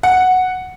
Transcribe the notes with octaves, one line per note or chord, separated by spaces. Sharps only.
F#5